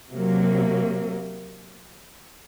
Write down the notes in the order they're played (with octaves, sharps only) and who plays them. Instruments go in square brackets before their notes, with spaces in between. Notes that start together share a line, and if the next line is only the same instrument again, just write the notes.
[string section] C3 F#3 A#3